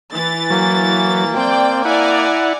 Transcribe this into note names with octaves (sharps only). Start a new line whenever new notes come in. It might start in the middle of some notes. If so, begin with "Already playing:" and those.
E3 A6
F#3 A#3
C4 D5 G5
E4 D5 F#5 G#5 A#5